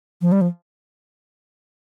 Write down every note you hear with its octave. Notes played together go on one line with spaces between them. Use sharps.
F3
G3
F3